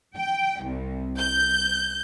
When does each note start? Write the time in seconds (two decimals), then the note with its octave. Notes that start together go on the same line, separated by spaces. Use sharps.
0.16 G5
0.64 C2
1.19 G6